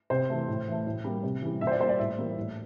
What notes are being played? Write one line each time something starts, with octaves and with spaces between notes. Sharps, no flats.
C3 C5
E3 A3
A2
E3 A3
A2
G3 A#3
C3
E3 G3
A#2 E5
C5
D5
G3 A#3 C5
D5
A2 E5
E3 G3 A#3
A2